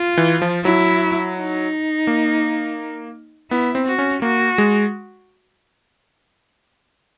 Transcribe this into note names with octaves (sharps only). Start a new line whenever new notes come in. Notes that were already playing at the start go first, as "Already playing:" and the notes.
Already playing: F4
E3
F3
F#3 E4
D#4
A#3
B3 E4
C4
F#4
C#4
A#3 F#4
G#3